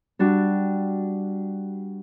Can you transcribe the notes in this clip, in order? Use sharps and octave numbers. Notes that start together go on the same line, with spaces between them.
G3 D4 F#4